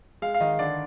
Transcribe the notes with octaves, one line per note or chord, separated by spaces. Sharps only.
G#3 F5
F5
D#3 D#5
D3 D5